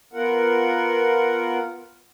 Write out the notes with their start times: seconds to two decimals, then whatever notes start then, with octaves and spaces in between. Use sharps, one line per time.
0.13 B3 F4 A#4 F#5